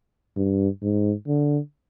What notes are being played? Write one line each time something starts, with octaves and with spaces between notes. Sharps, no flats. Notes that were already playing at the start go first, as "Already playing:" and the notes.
G2
G#2
D3